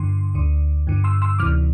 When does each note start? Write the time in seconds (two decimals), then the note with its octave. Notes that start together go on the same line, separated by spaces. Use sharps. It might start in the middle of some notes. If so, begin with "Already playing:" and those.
Already playing: G2 D3 C6
0.34 D2 D3
0.87 G2 D3
1.04 C6 E6
1.22 C6 E6
1.39 D2 C3 E3 D6 F6